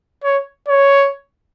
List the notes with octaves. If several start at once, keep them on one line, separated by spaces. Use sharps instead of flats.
C#5
C#5